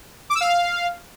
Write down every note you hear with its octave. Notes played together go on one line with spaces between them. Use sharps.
D6
E6
F5